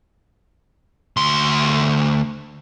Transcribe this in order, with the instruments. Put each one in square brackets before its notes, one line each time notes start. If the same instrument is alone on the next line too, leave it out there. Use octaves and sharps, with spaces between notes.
[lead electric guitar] D2 C6